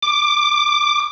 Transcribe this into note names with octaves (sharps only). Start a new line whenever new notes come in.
D6